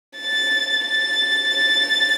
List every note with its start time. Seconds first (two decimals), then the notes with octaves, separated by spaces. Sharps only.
0.17 A6
0.84 A6
1.50 A6